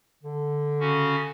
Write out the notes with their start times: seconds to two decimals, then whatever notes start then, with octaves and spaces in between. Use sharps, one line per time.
0.23 D3
0.80 C#3 C#4 F#4